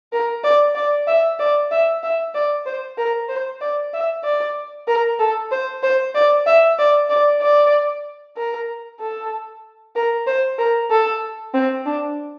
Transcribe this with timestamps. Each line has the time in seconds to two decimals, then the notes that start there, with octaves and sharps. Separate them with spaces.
0.12 A#4
0.44 D5
0.75 D5
1.07 E5
1.39 D5
1.71 E5
2.03 E5
2.34 D5
2.66 C5
2.98 A#4
3.29 C5
3.61 D5
3.93 E5
4.24 D5
4.88 A#4
5.19 A4
5.51 C5
5.83 C5
6.14 D5
6.46 E5
6.79 D5
7.10 D5
7.41 D5
8.37 A#4
9.00 A4
9.95 A#4
10.26 C5
10.59 A#4
10.90 A4
11.54 C4
11.86 D4